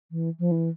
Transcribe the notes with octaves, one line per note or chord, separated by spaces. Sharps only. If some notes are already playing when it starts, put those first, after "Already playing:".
E3
F3
E3